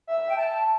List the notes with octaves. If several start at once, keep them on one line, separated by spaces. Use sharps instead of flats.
E5
G5
A5